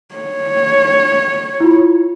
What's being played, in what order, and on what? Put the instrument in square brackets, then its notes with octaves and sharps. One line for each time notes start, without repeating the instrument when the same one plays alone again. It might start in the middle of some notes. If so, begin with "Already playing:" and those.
[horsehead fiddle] C#5
[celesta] E4 F4